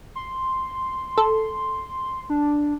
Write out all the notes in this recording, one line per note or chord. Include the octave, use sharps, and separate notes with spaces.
C6
A4
D4